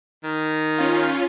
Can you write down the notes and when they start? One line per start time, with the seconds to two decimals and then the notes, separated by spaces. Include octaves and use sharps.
0.24 D#3
0.78 C#4 F4